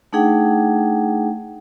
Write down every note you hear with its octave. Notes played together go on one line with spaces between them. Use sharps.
A3 D4 D#4 G#4 F#5 G5